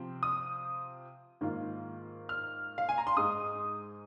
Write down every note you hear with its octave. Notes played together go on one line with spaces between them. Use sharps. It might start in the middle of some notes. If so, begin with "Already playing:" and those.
Already playing: C3 F3 C4
D#6
G#2 D#3 A#3 F4
F6
F5
G#5
A#5
C6
G#2 G#3 D#4 D#6